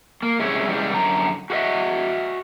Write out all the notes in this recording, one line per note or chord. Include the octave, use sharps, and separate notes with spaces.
A#3
C3 G3 G#3 C#4 E4 G#4
C#3 E3 G3 G#3
F#2 D3 A#5
F#4 G4 A#4 D#5 E5